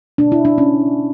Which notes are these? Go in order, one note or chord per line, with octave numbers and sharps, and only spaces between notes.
B2 A#3 D4
E4
D4
C#4